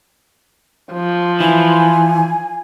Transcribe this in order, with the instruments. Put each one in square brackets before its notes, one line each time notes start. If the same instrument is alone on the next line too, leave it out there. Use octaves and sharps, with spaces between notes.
[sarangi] F3
[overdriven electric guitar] E3 [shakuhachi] G#5